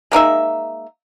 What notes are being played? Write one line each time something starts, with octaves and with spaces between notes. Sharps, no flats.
G#3 A#3 D#4 E5